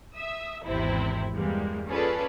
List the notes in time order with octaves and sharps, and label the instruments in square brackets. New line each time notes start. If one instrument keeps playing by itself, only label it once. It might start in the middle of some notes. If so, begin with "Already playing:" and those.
[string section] E5 D#6 E6
G#1 E2 C3 C4 E4
E2 G2 E3 G3 G#3 A#3
C#4 F4 G#4 A4 B4 D5